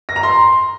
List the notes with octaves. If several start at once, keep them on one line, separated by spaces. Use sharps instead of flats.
A#6
A#5
C6